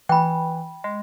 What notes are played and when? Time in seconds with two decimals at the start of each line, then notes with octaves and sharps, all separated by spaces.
0.09 E3 G5 B5
0.84 G#3